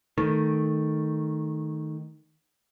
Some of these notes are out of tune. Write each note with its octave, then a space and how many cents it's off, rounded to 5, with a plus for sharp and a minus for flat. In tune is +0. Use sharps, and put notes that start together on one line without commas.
D#3 +0 A3 +0